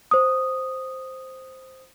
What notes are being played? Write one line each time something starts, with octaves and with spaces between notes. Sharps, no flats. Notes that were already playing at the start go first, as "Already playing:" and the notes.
C5 D#6